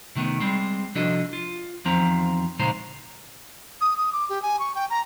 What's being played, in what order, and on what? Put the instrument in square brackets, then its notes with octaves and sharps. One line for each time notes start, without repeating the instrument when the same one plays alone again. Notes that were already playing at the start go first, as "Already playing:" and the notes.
[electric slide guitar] C3 D#3 A3 B3
G3 G#3 C4
C3 F3 D4 F#4 A4 D#5
F4
E2 D#3 F3 C4 A#5
A#2 C#3 G#3 D#4 C5 A#5
[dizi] D#6
D#6
D6
G4
G#5
C#6
G5
A#5